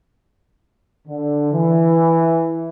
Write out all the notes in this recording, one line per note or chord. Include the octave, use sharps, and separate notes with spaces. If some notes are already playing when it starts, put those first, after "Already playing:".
D3
E3